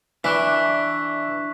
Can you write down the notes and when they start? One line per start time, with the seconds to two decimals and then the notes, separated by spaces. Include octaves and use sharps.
0.24 E3 D4 D5 E5 C#6 F#6 B6